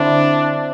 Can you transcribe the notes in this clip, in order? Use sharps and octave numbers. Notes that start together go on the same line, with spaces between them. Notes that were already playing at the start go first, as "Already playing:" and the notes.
Already playing: D3 C4 D4 E4